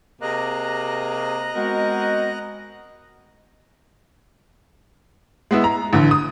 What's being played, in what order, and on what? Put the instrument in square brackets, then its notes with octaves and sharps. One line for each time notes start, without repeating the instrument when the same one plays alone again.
[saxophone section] C3 A#3 G#4 [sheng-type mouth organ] D#5 A#5 F#6
[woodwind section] G#3 B3 F#4 [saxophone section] C4 A#4 F#5
[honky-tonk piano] G#3 B3 E4
A#5
A1 D3
D#6